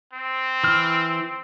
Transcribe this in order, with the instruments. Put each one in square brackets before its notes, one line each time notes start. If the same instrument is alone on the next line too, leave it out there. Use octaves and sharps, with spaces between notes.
[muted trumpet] C4
[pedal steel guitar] E3 F6